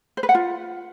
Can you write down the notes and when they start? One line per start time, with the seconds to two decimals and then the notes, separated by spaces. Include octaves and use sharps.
0.17 C5
0.23 B4
0.29 F#5
0.35 F4